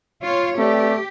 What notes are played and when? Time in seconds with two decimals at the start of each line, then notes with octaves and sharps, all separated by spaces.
0.21 F4 C#5
0.58 A3 C4 G4 B4 D5